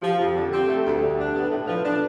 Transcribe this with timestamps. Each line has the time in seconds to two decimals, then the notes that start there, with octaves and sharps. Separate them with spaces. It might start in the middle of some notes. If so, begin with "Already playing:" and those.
0.02 F3 G4
0.19 F2 G4
0.35 D3 A4
0.52 C4 G4
0.64 A3 A4
0.74 G4
0.85 D2 A4
0.97 D3 G4
1.19 D4
1.34 B3 G4
1.50 A2 A4
1.67 F3 B4
1.84 D4 A4